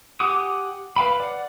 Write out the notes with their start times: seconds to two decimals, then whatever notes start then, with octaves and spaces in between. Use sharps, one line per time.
0.20 G4 F#5 G#5 D6 D#6
0.96 B4 F5 G5 B5
1.20 D5 F#5